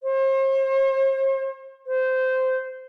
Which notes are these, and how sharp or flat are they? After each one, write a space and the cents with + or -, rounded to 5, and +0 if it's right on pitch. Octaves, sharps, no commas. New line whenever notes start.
C5 +40
C5 -15